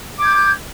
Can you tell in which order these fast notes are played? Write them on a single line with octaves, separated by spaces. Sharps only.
D6 G#6 G6